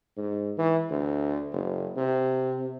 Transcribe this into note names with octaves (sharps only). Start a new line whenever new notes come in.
G#2
E3
D2
F#1
C3